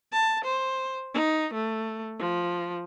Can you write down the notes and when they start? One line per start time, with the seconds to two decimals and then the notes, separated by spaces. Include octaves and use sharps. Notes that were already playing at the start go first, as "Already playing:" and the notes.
0.12 A5
0.44 C5
1.14 D#4
1.54 A3
2.19 F3